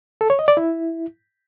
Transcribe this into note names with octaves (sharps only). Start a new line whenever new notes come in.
A4
C#5
D#5
D5
E4